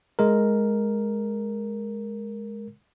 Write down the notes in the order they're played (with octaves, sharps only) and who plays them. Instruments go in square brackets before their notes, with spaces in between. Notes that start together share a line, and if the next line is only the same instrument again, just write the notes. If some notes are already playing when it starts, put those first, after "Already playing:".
[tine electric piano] G#3 A#4